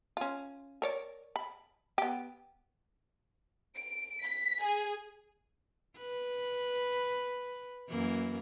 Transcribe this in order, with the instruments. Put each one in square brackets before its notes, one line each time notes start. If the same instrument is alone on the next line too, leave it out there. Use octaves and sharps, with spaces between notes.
[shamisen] C#4 F4
A#4 C#5 D5
B5
B3 G4
[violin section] D7
B6
G#4
[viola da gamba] B4
F#2 E3 A#3